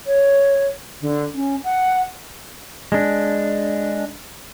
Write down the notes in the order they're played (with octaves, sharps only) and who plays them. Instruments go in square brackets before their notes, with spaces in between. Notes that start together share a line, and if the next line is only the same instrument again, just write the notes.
[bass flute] C#5
D3
C#4
F#5
[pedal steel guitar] G#3 D4